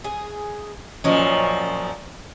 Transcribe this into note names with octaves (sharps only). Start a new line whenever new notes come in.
G#4
F#2 A#2 F3 C#4 C#5 D#5